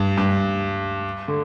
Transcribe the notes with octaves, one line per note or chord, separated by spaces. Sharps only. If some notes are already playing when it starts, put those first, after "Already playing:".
Already playing: G2
G2
D3